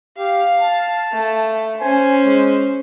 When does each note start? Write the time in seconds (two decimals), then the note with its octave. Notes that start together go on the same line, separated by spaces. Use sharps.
0.18 G4 F5
0.59 A5
1.12 A3
1.80 C#4 C5 G#5
2.25 G#3